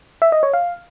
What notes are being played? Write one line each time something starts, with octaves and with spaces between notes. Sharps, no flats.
E5
D#5
C#5
F5